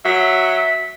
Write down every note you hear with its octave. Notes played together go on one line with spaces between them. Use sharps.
F#3 E5